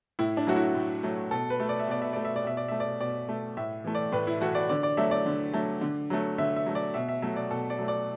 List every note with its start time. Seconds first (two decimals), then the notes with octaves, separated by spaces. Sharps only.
0.19 A2 E4
0.37 D4
0.47 F#3 A3 F#4
0.56 E4
0.75 A2
1.03 F#3 A3
1.31 B2 A4
1.50 B4
1.60 A3
1.69 D5
1.80 E5
1.88 B2 D5
2.02 E5
2.13 A3 D5
2.25 E5
2.36 D5
2.44 B2 E5
2.57 D5
2.68 A3 E5
2.80 D5
3.01 B2 D5
3.29 A3
3.57 A2 E5
3.84 E3 A3
3.95 D5
4.12 A2 B4
4.27 E4
4.41 E3 A3 F#4
4.55 D5
4.69 D3 D5
4.83 D5
4.97 F#3 A3 E5
5.11 D5
5.26 D3
5.53 F#3 A3
5.81 D3
6.10 F#3 A3
6.38 D3 E5
6.56 E5
6.66 F#3 A3
6.75 D5
6.94 B2 E5
7.09 E5
7.22 F#3 A3 E5
7.36 D5
7.51 B2 A4
7.70 D5
7.78 F#3 A3
7.88 D5